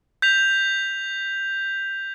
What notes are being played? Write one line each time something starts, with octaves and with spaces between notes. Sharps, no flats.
G6 B6 F7